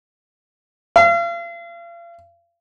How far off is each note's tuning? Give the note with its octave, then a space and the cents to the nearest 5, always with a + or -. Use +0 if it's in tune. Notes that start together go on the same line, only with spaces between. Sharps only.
F5 -40